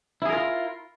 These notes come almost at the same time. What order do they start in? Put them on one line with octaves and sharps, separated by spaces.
E4 G#4 A#4 F4